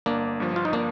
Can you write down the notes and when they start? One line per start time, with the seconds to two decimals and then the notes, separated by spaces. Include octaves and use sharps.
0.06 G1 A#3 D4
0.40 G2 F3
0.56 F4
0.65 D#4
0.73 A#3 D4